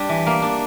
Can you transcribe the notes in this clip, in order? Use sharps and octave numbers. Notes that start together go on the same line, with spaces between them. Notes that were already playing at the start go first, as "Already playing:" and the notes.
Already playing: G3 D4
E3
A#3
D4